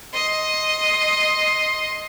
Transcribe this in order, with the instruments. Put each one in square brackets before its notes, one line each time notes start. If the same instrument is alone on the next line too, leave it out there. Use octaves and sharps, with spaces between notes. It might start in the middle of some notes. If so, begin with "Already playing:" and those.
[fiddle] D#5 C6